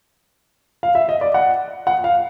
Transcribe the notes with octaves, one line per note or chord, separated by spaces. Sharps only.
F5
E5
D#5
D5
F#5
F#5
F5